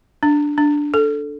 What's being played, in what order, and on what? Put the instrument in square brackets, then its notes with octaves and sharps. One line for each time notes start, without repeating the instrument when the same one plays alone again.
[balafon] D4
D4
A4